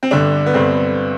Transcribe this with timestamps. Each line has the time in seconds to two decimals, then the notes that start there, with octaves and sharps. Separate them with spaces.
0.03 C4
0.11 G1 G2 D3 D4
0.46 B3
0.54 G1 G2 D3 C4